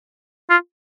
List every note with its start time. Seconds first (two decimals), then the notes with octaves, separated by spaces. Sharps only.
0.50 F4